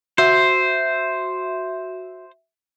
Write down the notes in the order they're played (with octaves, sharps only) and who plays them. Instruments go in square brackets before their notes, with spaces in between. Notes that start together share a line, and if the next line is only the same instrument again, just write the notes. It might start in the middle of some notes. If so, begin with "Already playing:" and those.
[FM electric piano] F#4 E5 [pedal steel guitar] C5